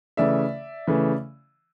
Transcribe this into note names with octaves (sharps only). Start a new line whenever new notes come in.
C#3 E3 A3 D5 E5
C#3 E3 A3